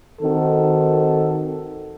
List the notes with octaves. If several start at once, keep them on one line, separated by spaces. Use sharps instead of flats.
D#3 C4 F#4 A4